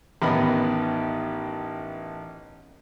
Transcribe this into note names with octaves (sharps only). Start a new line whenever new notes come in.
A1 D#3 B3 D#5 B5